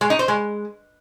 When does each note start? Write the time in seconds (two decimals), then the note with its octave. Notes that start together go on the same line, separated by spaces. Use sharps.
0.01 G#3
0.10 D#4
0.19 C5
0.28 G#3